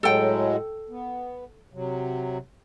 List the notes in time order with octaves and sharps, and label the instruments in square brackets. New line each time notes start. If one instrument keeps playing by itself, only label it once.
[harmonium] A2 F#3 G#3 [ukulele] A4 G5
[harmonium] B3
C3 F#3